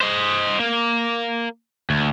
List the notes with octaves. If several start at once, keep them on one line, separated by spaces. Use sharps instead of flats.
C5 D#5
A#3
D2